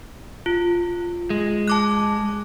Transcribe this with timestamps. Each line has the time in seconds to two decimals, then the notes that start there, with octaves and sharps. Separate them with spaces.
0.46 F4
1.30 G#3
1.68 A5 D6 F#6